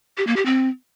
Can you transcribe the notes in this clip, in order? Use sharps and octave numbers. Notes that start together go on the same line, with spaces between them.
G4
A#3
G4
C4